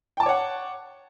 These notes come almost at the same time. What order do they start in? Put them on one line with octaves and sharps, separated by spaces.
G5 A5 D6 C#5 F#5